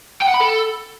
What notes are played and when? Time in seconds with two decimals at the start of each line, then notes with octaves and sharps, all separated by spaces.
0.22 G5
0.28 F#5
0.34 B5
0.41 A4